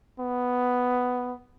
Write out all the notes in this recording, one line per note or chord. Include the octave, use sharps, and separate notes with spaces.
B3